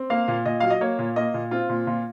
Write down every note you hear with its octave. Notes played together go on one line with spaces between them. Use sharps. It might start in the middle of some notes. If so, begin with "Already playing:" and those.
Already playing: C4
A#3 F5
A#2
A#2 D#5
F#3 F5
D#5
A#3 C#5
A#2
A#3 D#5
A#2
C4 F4
A#2
A#2